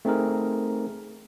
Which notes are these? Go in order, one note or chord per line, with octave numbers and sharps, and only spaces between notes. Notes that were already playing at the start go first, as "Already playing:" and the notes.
A3 C4 D#4 G#4 A#4